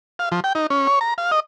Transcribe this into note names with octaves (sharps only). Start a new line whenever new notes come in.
F5
F3
G5
D#4
C#4
C#5
A#5
F5
D#5